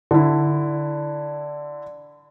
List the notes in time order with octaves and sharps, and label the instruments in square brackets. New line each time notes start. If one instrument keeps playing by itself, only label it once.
[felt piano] D3 E4